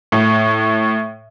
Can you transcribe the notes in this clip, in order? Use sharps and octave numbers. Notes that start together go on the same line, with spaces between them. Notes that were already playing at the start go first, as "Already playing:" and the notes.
A2